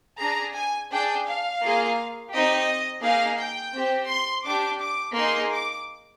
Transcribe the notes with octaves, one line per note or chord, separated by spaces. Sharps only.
D4 G#4 A#5
G#5
D4 G#4 G5
F5
A#3 F4 G#4
C4 D#4 G4 D#5
A#3 D#4 G#4 F5
G5
C4 G4
C6
D4 G4 D6
D6
A#3 D#4 G#4 C6
D6